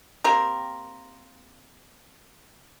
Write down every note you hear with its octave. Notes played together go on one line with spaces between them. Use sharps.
A#3 C4 G4 A#4